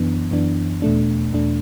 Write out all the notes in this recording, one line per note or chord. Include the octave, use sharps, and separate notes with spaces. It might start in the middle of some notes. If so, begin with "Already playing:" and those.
Already playing: F#2 E3 B3 D4
F#2 E3 B3 D4
E2 B2 A3 D4
E2 B2 A3 D4